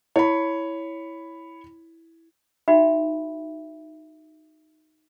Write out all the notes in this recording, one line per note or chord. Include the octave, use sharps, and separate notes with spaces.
E4 C#5 B5
D#4 F#4 E5 G5 B5